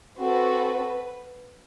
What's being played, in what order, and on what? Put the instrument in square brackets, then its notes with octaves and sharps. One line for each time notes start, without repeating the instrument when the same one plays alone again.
[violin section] C4 F#4 A4 B4